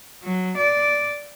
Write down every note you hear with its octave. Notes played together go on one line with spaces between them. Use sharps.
F#3
D5